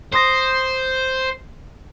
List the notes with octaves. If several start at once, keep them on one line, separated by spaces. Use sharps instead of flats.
C5 C6 D#6 A#6